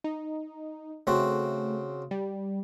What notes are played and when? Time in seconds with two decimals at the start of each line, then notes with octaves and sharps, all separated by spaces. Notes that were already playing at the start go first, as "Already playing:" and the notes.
0.04 D#4
1.07 C#3 A3 C4 F#4
2.11 G3